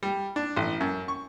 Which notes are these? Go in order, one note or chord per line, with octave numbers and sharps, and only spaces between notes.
G3
D4
A1
F#2
C#6